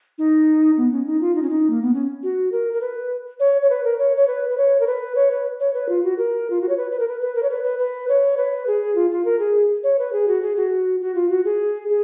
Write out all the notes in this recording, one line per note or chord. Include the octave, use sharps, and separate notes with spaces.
D#4
B3
C#4
D#4
F4
D#4
C#4
D#4
A#3
B3
C#4
F#4
A#4
A#4
B4
C#5
C#5
B4
A#4
C#5
C#5
B4
B4
C#5
A#4
B4
C#5
B4
C#5
B4
F4
F#4
A#4
F4
F#4
C#5
B4
B4
A#4
B4
B4
A#4
C#5
B4
B4
B4
C#5
B4
G#4
F4
F4
A#4
G#4
C#5
B4
G#4
F#4
G#4
F#4
F#4
F4
F#4
G#4
G#4